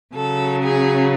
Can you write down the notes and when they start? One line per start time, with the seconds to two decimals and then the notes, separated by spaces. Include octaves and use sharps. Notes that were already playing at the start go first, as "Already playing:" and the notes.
0.14 C#3 F#3 A4
0.60 G#4